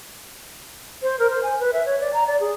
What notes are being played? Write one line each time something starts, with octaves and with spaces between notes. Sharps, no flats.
C5
A#4
C5
G#5
B4
E5
C#5
D5
A#5
D5
G#4